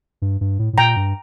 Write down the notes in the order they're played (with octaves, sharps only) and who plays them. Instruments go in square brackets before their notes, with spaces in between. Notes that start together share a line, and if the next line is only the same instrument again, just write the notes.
[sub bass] G2
G2
A2
A2
[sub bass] A#2 [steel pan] G5 A#5
[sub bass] G2